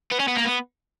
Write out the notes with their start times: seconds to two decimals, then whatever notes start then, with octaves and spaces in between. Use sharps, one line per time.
0.12 B3
0.20 C#4
0.28 B3
0.37 A#3
0.45 B3